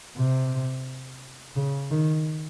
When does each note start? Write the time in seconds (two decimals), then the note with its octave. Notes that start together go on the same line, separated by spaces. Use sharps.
0.17 C3
1.56 C#3
1.91 D#3